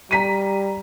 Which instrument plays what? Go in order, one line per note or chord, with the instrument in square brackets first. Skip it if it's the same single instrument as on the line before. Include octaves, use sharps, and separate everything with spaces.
[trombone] G3 [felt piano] A#5 B6 D#7